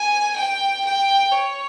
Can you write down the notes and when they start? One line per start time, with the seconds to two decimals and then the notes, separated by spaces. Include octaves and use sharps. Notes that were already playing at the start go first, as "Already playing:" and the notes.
Already playing: G#5
0.36 G5
0.85 G5
1.32 C#5